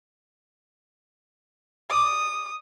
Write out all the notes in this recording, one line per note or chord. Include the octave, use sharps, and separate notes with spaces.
D5 D#6